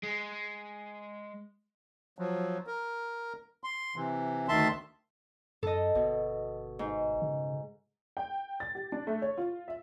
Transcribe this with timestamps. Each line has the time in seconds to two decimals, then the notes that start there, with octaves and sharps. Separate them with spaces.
0.03 G#3
2.19 F3 F#3
2.67 A#4
3.64 C6
3.96 C3 E3
4.48 D2 D#3 E5 A5 C6
5.63 F#2 A4 D#5
5.95 G1 B2
6.79 G#2
7.22 C#3
8.17 G5
8.60 A6
8.75 G4
8.92 D4
9.07 A3
9.22 C#5
9.38 F4
9.68 E5